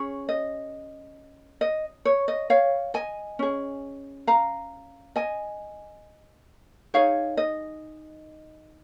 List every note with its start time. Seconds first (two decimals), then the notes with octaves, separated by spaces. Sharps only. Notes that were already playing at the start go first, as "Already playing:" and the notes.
Already playing: C#4 G#4 C#5
0.29 D#5
1.61 D#5
2.05 C#5
2.28 D#5
2.50 C#5 F5
2.94 D#5 G#5
3.39 C#4 G#4
4.27 F5 A#5
5.16 D#5 G#5
6.94 D#4 G#4 C#5 F5
7.37 D#5